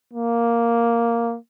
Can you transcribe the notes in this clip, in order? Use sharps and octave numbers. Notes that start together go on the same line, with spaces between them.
A#3